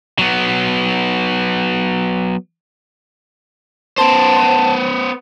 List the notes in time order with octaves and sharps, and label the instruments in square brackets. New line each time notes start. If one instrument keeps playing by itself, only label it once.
[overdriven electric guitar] F#3 B3
[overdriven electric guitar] B3 C5 [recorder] A5